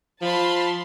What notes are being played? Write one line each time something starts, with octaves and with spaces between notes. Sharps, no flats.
F3 A5 B5 C6